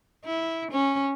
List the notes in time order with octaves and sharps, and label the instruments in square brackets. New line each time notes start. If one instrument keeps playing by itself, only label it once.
[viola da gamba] E4
C#4